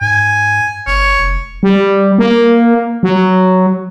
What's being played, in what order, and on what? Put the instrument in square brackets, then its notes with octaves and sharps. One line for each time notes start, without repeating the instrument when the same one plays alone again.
[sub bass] G#2 [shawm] G#5
[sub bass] G1 [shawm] C#5
[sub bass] F1
[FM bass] G3
A#3
F#3